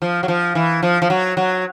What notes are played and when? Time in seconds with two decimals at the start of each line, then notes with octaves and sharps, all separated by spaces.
0.02 F3
0.23 F#3
0.28 F3
0.55 E3
0.83 F3
1.02 F3
1.10 F#3
1.37 F#3